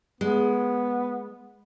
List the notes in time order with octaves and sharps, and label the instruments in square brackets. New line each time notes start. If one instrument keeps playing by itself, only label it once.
[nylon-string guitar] G#3 [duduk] B3